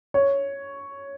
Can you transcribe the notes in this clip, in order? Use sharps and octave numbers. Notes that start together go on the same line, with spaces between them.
C#5